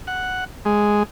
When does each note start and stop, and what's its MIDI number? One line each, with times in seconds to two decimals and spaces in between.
0.07 0.44 78
0.65 1.03 56